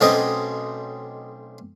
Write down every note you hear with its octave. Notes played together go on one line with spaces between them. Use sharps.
B1 A3 C4 C#4 D#5 G5